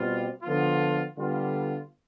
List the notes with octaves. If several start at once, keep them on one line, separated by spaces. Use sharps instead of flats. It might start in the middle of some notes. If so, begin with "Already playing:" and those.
Already playing: B2 G3 C4 F4
D3 F3 B3 F4
D3 G3 B3 F4